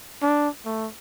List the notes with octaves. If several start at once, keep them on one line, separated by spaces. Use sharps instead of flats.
D4
A3